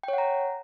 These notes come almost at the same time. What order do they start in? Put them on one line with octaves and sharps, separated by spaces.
G5 C#5 F#5 A#5